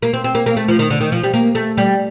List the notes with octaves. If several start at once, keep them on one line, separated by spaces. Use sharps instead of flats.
A#3
C4
C4
A#3
A#3
A3
F3
D#3
D3
D#3
F3
G3
A#3
A3
G3